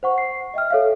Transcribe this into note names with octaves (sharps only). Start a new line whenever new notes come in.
C5 F#5 C#6
C7
D#5 E5 G5 F6
A4 C#5 E5 F5